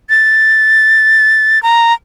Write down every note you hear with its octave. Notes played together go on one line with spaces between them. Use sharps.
A6
A#5